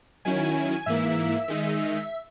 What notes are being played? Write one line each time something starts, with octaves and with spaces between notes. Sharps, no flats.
D#3 F#3 C#4 E4 G#5
G#2 E3 A#3 E4 E5
D#3 G#3 D#4